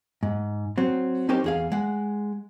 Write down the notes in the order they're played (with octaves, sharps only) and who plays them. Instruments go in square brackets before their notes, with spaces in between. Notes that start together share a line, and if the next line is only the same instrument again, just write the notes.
[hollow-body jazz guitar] G#2
F#3 C4
C4 C#4 D#4 G4 A#4 C5
E2 G#4 F5
G#3 F#5